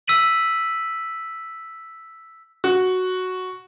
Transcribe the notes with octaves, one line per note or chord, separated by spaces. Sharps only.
E6 B6 D#7 F#7
F#4